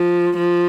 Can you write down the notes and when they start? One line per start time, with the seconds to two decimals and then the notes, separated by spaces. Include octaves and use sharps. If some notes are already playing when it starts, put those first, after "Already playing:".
Already playing: F3
0.37 F3